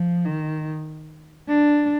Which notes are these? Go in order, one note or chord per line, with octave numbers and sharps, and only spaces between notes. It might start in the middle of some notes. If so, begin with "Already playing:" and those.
Already playing: F3
D#3
D4